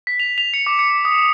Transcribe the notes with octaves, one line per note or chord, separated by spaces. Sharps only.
B6
F7
F7
C#7
D6
C#7
D#6